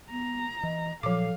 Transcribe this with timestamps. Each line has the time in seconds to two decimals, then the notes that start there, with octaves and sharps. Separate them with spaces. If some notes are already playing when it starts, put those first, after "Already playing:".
0.11 B3 A#5
0.63 E3 D#5
1.03 A#2 F3 F#3 A4 F5 D6